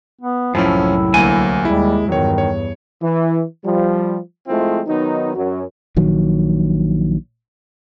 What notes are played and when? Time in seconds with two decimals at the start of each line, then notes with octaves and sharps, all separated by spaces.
0.21 B3
0.55 C2 F#2 A2 F3 F#3 C#4 E4
1.14 D2 A#3 G#5
1.65 D#2 G3 G#3 E4
2.08 E2 G2 D#3 F#3 C#5
2.38 C#5
3.02 E3
3.64 F3 G3
4.47 F3 G#3 A3 C4 E4 F4
4.87 D#3 F#3 B3 D#4
5.34 F#2 F#3
5.97 A#1 D#3 F#3